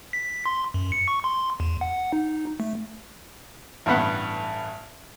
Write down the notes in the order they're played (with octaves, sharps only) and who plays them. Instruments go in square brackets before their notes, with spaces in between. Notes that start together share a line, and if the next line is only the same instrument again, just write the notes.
[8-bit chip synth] B6
C6
F#2
C#7
C#6
C6
E2
F#5
D#4
A3
[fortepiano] A1 G2 B3 F#5